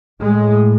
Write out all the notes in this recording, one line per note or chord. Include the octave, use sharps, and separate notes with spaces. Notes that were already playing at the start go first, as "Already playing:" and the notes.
A2 G#3